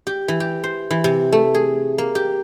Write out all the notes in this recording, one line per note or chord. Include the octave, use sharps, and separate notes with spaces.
G4
E3
G4
C5
E3
C3
A3
G#4
A#3
G4